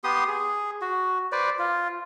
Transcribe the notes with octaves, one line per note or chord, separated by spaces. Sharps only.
B3 G4 C6 D#6
G#4
F#4
B4 C5 D5
F4